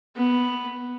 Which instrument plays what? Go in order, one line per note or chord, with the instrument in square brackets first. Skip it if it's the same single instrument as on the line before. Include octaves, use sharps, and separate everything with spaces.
[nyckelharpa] B3